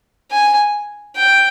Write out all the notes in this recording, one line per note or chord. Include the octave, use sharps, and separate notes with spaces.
G#5
G5